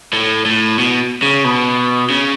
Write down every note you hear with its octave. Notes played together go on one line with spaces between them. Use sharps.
A2
A2
B2
C#3
B2
C#3